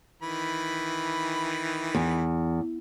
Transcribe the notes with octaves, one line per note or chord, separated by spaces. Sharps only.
D#3 E3 B5
E2